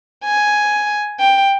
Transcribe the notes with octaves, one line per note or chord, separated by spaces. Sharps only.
G#5
G5